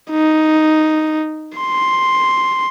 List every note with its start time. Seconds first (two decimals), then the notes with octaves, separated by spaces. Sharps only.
0.10 D#4
1.58 C6